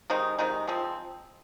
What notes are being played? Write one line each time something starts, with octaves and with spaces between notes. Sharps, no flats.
C3 D#3 G#3 D#4
C3 D#3 G#3 D#4
F3 G#3 C4